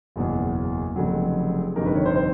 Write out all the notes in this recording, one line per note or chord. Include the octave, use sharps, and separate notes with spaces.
F#1 E2 B2 F#3
F1 F2 C#3 F#3
G1 F2 C3 D#3 A#4
B4
C#5
C5
C5